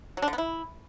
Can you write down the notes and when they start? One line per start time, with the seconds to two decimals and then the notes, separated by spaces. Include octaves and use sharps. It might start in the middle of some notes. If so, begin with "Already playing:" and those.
0.17 F#3
0.22 D4
0.28 D3
0.33 B3
0.38 E4